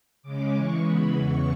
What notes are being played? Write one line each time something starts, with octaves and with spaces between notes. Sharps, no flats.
C#3 G#3 C#4 D6
C#3 E3 G#3 C#6
C#3 E3 G#3 B3 B5
E2 C#3 E3 B3 C#6